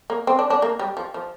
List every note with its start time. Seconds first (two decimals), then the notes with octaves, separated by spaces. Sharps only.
0.10 A#3
0.27 C4
0.39 D4
0.50 D4
0.62 A#3
0.79 G3
0.97 F3
1.14 F3